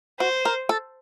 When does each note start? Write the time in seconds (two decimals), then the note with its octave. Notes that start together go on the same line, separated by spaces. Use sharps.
0.20 F#4 C5
0.45 A#4
0.69 A4